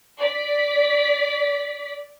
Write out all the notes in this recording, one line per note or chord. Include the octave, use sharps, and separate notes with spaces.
D5 B6